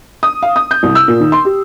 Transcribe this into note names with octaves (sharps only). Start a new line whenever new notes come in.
D#6
F5
D#6
G6
C2
E6
A#2
D#2
C6
G4